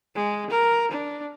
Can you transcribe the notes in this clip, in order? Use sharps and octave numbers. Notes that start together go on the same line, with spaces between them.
G#3
A#4
D4